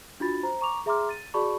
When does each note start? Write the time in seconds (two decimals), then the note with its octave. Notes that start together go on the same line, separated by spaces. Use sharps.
0.20 D4 F4 F#4 B5 A6
0.43 C5 A#5
0.61 A#5 C#6 D6 F7
0.86 G#4 E5 A#5 C6 D6 F6
1.09 A6 D#7
1.34 F#4 G#4 D5 A5 B5 C#6